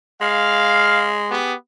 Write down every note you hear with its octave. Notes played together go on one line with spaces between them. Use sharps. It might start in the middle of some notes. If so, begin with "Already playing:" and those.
G#3 F5
B3 G4 G#4